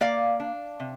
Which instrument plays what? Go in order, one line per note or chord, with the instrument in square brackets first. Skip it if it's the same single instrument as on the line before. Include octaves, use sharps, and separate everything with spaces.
[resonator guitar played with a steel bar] A#3 D5 F5
D4
C3